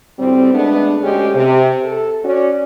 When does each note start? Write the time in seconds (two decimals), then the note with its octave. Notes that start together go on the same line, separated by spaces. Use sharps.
0.19 D2 A2 G3 C4
0.54 G#3 A3 B3 D4
1.02 D2 G#3 C#4 G4
1.34 C3
1.83 A4
2.24 C#4 F#4 D5